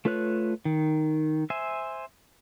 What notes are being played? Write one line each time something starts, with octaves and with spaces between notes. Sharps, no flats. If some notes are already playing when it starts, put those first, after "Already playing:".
A3 F4 B4 C#5 F#6
D#3
C5 E5 G#5